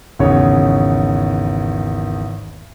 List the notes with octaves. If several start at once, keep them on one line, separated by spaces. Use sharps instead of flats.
G#1 E2 C#3 C#5